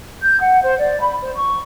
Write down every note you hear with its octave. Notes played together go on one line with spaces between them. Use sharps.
G6
F#5
C5
D5
B5
C5
C#6